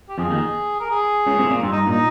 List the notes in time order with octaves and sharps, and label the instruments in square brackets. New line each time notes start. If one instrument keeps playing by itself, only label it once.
[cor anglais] G4
[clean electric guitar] F2 F3 [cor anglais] G#4
[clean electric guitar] D#2 D#3
[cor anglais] A#4
G#4
[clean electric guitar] C#2 C#3
C2 C3
A#2
[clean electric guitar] G2 [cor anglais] C4
[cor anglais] D#4
[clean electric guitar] A#2 [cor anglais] D#4